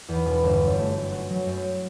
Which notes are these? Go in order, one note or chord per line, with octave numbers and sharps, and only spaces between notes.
E2
E1
G1
F#2
A3
A3
F#4
F#3
F#2